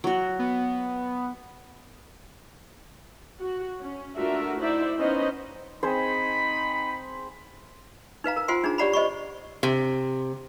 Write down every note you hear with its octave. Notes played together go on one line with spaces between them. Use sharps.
F#3 F#4
B3
F#4
C#4
A3 D4 F4 F#4 A#4 E5
D#4 E4 C5 D5 E5
B3 C#4 D#4 B4 C5 D#5
C4 D#4 G#4 C5 B5
D#4 B4 F5 A#5
A#4 A#5
F4 C5 F#5 G#5 C6
D4 D#4 G#4 A#5
G4 C#5 D5 F#5 A#5 B5
C5 D#5 B5 C#6
C3